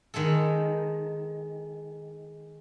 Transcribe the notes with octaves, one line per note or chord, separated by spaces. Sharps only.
D#3 G#3 G#4 A4